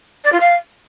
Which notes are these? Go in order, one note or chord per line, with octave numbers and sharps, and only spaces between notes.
D5
F4
F5